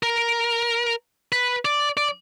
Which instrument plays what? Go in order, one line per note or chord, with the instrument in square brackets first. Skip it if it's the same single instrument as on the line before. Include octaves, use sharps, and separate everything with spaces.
[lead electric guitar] A#4
B4
D5
D5